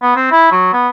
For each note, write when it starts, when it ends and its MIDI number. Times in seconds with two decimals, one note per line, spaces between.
0.02 0.15 59
0.16 0.30 60
0.31 0.52 64
0.52 0.72 54
0.73 0.88 59